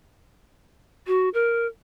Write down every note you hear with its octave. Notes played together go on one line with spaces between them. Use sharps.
F#4
A#4